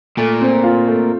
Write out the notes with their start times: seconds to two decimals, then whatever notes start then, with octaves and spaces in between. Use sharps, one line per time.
0.17 A#2 A3
0.41 C4
0.63 F4
0.87 A3